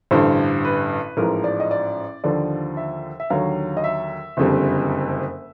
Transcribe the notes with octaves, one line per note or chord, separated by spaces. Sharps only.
A1 G2 D3 C5
B4
A1 G#2 F3 A#4
D5
D#5
D5
D#2 D3 F3 D5
E5
E5
D#2 D3 F#3 F5
D#5
E5
F#1 F2 D3 G3